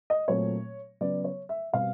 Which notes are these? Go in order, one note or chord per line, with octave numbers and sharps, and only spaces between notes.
D#5
A#2 F#3 A3 C4 C#5
C#3 F#3 B3 D5
C#5
E5
B2 G3 C4 F5